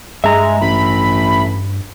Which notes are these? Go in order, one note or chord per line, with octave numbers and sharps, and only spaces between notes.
G2 G#3 E5 A#5
A1 B5